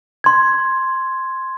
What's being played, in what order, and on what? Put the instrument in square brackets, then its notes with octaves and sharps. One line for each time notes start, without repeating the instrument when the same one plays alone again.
[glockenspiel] C6 G#6